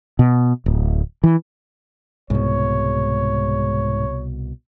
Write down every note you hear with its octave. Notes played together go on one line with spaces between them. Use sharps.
B2
D1
E3
C2 G#2 B2 C#5